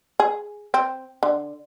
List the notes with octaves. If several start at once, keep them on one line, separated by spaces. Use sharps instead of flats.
G#4
C4
D3